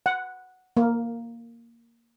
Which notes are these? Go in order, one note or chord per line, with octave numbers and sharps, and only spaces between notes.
F#5
A#3